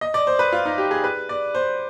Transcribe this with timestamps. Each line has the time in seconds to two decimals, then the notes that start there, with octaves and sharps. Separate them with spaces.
0.01 D#5
0.14 D5
0.27 C5
0.39 B4
0.53 F4
0.65 D#4
0.78 G4
0.91 G#4
1.04 B4
1.29 D5
1.55 C5